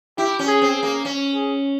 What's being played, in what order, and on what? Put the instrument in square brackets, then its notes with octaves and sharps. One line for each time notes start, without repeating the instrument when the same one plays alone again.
[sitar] E4 [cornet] G4
[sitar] C#4
[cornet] G#4
[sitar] C4
[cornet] G#4
[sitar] A#3
C#4
[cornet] G#4